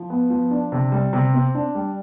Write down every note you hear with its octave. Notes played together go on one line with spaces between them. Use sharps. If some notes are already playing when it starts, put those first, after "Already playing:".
Already playing: F3
B3
F3
D4
C3
G3
C3
C4
D4
G3